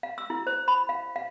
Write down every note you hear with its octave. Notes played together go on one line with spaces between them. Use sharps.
F5
E6
E4
C5
B5
F5
F5